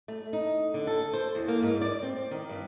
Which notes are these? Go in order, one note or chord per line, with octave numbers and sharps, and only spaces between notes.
A3
D#4
D3
A4
C5
E2
A#3
G#2
D5
C4
D#3
G2